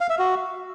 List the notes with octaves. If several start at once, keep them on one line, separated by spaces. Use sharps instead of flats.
F5
E5
F#4